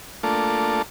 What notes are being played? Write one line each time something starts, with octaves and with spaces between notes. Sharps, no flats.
A3 A#3 D4 F4 A4